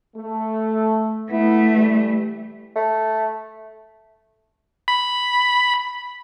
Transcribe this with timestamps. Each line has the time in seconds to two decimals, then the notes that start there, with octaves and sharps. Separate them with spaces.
0.16 A3
1.30 A3 B3 E4
1.76 E3 G3
2.76 A3
4.88 B5